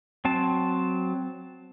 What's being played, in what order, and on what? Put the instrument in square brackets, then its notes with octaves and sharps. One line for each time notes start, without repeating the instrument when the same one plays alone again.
[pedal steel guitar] F#3 C4 A5